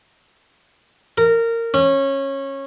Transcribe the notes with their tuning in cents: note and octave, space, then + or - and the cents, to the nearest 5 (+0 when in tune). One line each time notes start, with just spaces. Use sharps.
A#4 -20
C#4 -20